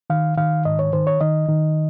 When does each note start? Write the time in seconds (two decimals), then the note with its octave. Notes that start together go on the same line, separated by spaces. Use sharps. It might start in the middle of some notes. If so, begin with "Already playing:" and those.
0.10 D#3 F5
0.37 D#3 F5
0.65 G#2 D#5
0.79 C#5
0.93 D#3 C5
1.07 C#5
1.21 D#3 D#5
1.49 D#3